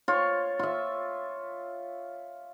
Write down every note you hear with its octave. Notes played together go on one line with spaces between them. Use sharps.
F4 C#5
F4 E5